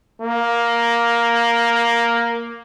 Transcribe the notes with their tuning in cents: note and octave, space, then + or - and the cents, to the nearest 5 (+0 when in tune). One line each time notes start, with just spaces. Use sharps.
A#3 +5